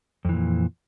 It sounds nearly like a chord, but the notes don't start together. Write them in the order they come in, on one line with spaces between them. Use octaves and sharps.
F2 E3 A#2